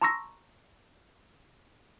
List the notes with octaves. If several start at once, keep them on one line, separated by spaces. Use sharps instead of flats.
A5 A#5 C6 C#6 E6 A#6